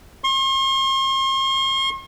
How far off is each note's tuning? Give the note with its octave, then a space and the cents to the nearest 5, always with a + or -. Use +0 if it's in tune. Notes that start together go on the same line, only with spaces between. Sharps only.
C6 +45